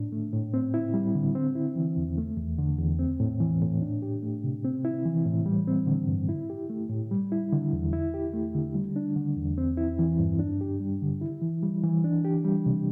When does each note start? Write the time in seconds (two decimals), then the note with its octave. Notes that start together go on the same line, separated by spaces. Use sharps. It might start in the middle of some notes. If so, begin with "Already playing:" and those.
Already playing: A2 D4
0.12 A3
0.33 A2
0.54 C4
0.74 E4
0.94 G3
1.15 D3
1.35 C4
1.55 E4
1.76 E3
1.97 E2
2.18 A3
2.37 E2
2.58 D3
2.79 E2
2.99 C4
3.20 A2
3.40 E3
3.62 A2
3.82 D4
4.02 G4
4.22 A3
4.44 C3
4.65 C4
4.85 E4
5.05 E3
5.25 A2
5.46 G3
5.67 C4
5.87 D3
6.08 G2
6.29 E4
6.50 G4
6.69 A3
6.90 A2
7.11 G3
7.32 E4
7.52 D3
7.73 E2
7.93 E4
8.14 G4
8.33 A3
8.54 D3
8.75 G3
8.96 D4
9.16 D3
9.36 E2
9.58 C4
9.77 E4
9.99 E3
10.19 G2
10.39 D4
10.61 G4
10.80 G3
11.02 D3
11.21 E4
11.42 E3
11.63 G3
11.83 E3
12.04 D4
12.25 G4
12.45 G3
12.66 C3